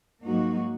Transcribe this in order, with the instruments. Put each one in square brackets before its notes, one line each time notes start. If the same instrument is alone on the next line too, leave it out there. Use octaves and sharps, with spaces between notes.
[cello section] G#2 F#3 A#3 D#4 F#4